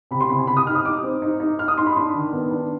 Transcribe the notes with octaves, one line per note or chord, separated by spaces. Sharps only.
C3 B5
C6
C3 B5
G#5
C3 B5
D#6
D#4 F6
D#6
D#4 D6
C4
D#4
D#4
D#4 F6
D#6
D#4 C6
B5
D4 C6
D#3
B3
D4